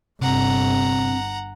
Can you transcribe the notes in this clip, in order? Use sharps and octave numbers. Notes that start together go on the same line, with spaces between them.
G1 C3 C4 F#5 A#5